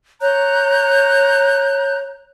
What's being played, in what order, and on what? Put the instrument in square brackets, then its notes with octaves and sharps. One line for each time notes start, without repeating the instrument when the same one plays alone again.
[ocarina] C#5 [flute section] A#5 F#6 G6